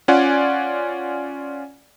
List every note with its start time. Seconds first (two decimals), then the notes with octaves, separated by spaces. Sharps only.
0.08 C#4 F4 D5 F#5 G#5